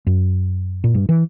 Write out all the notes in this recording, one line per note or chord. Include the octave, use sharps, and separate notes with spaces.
F#2
A#2
G2
E3